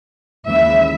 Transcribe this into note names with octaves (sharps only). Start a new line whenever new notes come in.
D#2 C#3 E3 G#3 E5